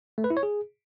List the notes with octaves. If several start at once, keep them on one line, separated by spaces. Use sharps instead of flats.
A3
B4
E4
C#5
G#4